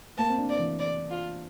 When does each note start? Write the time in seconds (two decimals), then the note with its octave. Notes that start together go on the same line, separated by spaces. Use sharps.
0.18 A#3 A5
0.30 C4
0.38 D4
0.49 D5
0.59 E3
0.79 D5
1.11 F4